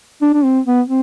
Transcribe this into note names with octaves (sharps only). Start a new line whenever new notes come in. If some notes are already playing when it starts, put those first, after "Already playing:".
D4
D4
C4
B3
C4